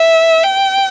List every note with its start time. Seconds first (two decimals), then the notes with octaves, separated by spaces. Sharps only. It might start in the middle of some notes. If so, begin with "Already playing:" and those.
Already playing: E5
0.44 G5